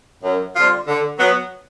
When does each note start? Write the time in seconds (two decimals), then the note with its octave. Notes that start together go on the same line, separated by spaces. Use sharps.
0.23 F#2
0.55 D3 G3 C4 F4
0.87 D3
1.18 F#3 B3